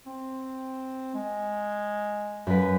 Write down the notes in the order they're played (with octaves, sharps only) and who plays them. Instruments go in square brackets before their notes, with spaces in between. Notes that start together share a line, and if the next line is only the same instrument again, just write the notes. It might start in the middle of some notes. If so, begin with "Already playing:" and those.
[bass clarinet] C4
G#3
[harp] F#2 B4